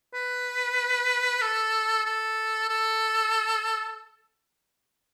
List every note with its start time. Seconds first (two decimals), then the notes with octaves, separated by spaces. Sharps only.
0.14 B4
1.42 A4
2.05 A4
2.69 A4